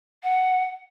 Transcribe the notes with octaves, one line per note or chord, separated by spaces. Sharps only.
F#5